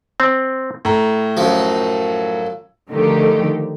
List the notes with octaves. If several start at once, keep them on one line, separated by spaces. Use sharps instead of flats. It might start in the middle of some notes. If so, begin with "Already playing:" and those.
C4
A2 A#5
F#2 F3
D3 D#3 F3 A3 D#4 G4